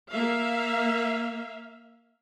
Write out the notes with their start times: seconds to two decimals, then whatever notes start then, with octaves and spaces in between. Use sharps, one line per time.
0.12 A#3 E5 F5